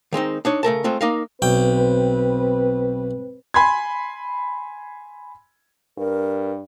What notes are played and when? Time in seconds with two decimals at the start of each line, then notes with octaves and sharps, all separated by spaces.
0.13 D#3 G#3 C4 D#4
0.45 D4 D#4 C#5
0.63 C#3 A3 A#4 A5
0.84 G#3 A3 C4 F4
1.01 A#3 D#4 A#4 D#5 F5
1.42 B1 C4 B4 G5
3.54 G#5 B5 C6 G#6
5.98 G2 A#4